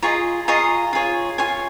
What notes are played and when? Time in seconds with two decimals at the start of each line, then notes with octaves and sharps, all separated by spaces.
0.02 F4 G#4 D#5 A#5 C#6
0.48 F4 G#4 D#5 A#5 C#6
0.93 F4 G#4 C#5
1.38 F4 G#4 C#5 G#5 C6